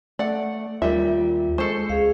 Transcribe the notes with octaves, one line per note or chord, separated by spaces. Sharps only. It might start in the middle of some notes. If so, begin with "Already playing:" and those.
A3 D5 F#5
D#2 G3 F4 A#4 D5 E5
G#3 A4 C5 C#6 C7
C#2 G#4 F5